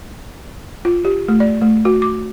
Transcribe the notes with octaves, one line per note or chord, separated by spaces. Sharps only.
F4
G4
A3
D5
A3
F#4
D6